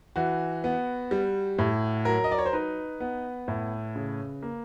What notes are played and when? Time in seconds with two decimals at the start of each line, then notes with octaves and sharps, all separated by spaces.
0.16 E3 F#4
0.64 B3
1.11 G3
1.59 A2
2.05 F#3 A#4
2.24 D#5
2.31 D5
2.38 C#5
2.46 C5
2.53 D#4 B4
3.00 B3
3.48 A2
3.96 C#3
4.42 A#3